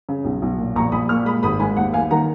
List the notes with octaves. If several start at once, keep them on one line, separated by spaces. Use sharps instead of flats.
C#3
B1
B1
A#2
A#1 A#5 C#6
A#1 B5 D#6
A#2 C#6 F6
G#3 B5 D#6
G#1 B5 D#6
G#2 G#5 B5
D#2 F#5
D#2 F5 G#5
D#3 F#5 A#5